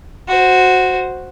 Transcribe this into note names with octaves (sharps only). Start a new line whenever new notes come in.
F#4 C5